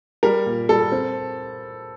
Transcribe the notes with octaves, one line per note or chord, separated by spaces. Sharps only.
G3 A#4
A#2
G3 A4
C4